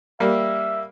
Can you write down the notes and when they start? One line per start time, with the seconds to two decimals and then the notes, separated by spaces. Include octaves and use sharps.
0.20 G3 A#3 E5